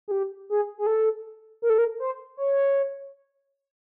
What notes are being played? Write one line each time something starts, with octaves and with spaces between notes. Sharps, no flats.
G#4
G4
G#4
G#4
A4
A#4
A4
A#4
C5
C#5